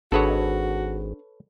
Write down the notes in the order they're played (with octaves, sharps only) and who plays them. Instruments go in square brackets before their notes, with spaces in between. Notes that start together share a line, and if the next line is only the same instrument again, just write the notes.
[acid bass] G#1 [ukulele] D4 G#4 F#5 [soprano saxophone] F#4 [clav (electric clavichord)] A4 B4 C#5